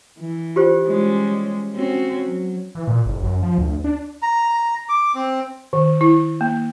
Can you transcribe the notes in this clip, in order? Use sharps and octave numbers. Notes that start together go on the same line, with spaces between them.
E3
F4 G4 C5
G3 G#3 C#4
C4 C#4 F#4
F#3
E3
A#2
F#1
F#2
F3
D2
D4
A#5
D6
C4
D#3
E4
A#3